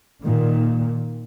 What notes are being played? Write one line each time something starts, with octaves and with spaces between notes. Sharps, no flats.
A#2 D#3